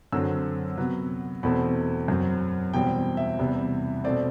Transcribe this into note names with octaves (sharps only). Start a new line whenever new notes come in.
F#2 D3 F#3 C4 E6
C3 F#3 B3
E2 B2 A3 C4 B5
F#2 F#3 C4
E2 B2 G3 C4 G5
E5
E2 C3 G3 B3
B2 A3 C4 D5